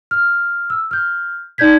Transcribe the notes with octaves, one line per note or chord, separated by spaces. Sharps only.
F6
E6
F6 G6
D#4 D5 G6 G#6 B6